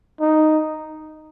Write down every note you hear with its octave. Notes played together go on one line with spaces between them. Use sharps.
D#4